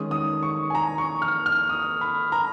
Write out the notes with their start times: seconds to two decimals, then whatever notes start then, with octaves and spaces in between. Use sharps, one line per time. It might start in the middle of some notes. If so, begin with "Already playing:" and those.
Already playing: D#3 G#3 C#4 D#6
0.11 D#6
0.43 C#6
0.70 G#5
0.75 A#5
0.98 C#6
1.22 F6
1.46 F6
1.69 D#6
2.01 B5
2.32 A#5